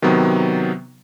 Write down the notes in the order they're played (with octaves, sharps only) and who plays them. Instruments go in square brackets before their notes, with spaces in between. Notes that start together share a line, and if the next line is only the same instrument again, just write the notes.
[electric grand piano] C3 D#3 F#3 B3